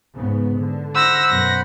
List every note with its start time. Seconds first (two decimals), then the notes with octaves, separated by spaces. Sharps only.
0.14 G#2 C#3 B3
0.58 D3
0.95 C5 F#5 B5 E6 A#6
1.30 F#2 B2 A#6